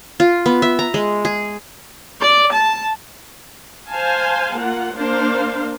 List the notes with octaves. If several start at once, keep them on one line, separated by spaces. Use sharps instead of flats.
F4
B3
E5
A#5
G#3
G#4
D5
A5
C5 F5 G#5 A5
A#3 F4 F#5
A#3 D4 C5 F5